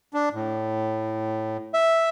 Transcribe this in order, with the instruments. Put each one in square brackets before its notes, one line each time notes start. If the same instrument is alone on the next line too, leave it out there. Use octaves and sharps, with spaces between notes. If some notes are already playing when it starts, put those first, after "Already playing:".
[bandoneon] D4
A2
[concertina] E5